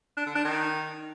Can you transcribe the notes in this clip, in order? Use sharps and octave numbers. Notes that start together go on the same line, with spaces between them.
D4
D3
D4
D#3